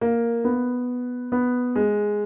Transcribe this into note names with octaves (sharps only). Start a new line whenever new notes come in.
A#3
B3
B3
G#3